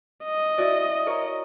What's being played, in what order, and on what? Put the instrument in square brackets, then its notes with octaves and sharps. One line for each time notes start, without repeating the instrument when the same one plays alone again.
[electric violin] D#5
[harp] E4 F#4 D5
A#4 C#5